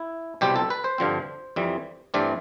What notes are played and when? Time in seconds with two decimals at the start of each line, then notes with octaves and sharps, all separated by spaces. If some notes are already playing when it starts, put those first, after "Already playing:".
Already playing: E4
0.41 C2 B2 G3 C4 G4
0.56 A4
0.70 B4
0.84 C5
0.98 G2 D3 F3 C4
1.56 F2 E3 G3
2.14 G2 E3 A3 C4 D5